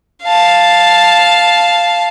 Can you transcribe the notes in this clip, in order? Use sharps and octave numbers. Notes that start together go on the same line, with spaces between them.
F5 A5